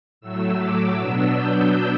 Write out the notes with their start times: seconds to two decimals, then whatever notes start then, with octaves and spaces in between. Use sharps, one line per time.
0.21 A2 F#3 A3 E6
0.59 D6
0.96 B2 F#3 B3 D4 E6
1.34 G6